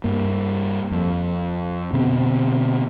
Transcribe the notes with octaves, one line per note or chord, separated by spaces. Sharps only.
G2 A#3
F2
B2 D3 B3 C4